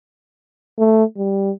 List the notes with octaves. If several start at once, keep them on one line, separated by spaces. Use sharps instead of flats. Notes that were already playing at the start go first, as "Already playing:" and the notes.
A3
G3